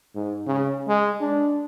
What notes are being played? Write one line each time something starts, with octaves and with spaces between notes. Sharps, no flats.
G#2
C#3
G#3
D4